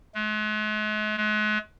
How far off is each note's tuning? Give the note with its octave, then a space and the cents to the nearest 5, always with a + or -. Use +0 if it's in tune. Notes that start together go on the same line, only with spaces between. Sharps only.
G#3 +45
G#3 +40